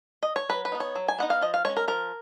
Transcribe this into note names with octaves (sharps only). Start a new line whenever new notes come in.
D#5
C#5
F#3 B4
B4
B3 D#4
C#5
F#3
G#5
B3 D#4 F#5
F5
F3 D#5
F5
G#3 C#4 C#5
A#4
F3 A#4